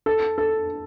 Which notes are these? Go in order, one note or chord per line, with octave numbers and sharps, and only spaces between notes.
A4
A4